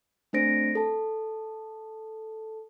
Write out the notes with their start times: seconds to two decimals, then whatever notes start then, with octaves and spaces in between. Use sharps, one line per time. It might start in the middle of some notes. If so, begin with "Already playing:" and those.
0.33 A3 C4 D4 C5 A#6 D7
0.75 A4 A5